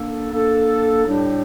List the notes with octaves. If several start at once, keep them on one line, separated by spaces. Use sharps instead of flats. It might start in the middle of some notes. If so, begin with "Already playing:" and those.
Already playing: A#3 D4 A4
A#3 D4 A4
A2 G3 D4 G4